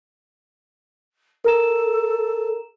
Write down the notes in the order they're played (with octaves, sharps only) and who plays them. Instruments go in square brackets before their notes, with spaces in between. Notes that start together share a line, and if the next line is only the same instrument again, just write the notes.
[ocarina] A4 [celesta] A#4 A#5 E7